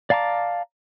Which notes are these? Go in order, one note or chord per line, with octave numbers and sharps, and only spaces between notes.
D5 F5 A5 A#5 D6